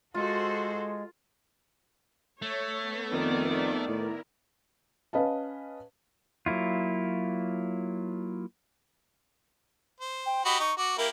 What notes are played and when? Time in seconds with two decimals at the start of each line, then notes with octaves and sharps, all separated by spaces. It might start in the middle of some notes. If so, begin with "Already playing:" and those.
0.14 G#3 F4 F#4 A4 C5
2.42 A3 C#5
2.81 B3
3.13 F2 D#3 D5
3.88 A2 E4 A#4
5.13 C#4 B4 D#5 F5 A5
6.46 F#3 A#3 E4 F4
10.00 C5
10.26 G5
10.45 F#4 G4 D#5 B5
10.60 D#4 C#6
10.78 F#4 D6
10.98 A#3 E4 G4 A#4